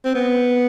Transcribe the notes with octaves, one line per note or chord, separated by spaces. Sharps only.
C4
B3